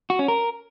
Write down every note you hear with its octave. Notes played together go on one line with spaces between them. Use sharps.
F#4
C#4
A#4